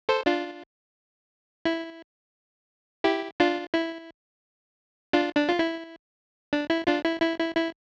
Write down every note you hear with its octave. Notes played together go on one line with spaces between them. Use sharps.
A4 C5
D4 F4
E4
E4 G4
D4 F4
E4
D4 F4
D4
F4
E4
D4
E4
D4 F4
E4
E4
E4
E4